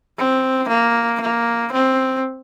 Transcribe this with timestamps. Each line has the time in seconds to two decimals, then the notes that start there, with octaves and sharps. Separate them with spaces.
0.18 C4
0.69 A#3
1.21 A#3
1.72 C4